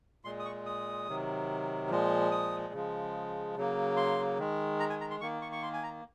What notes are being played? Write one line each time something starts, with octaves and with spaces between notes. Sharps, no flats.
A#2 G#3 C6
D#6
C#6
D#6
C3 D#3 F#3
A#2 F3 G#3
D#6
C#3 F3 G#3
C#3 F#3 A#3
C6
D#3 G#3
A#5
G#5
A#5
C6
D#3 A#3 C#6
C#6
C#6
C6
G#5
A#5